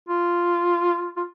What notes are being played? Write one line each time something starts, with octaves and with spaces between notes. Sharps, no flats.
F4
F4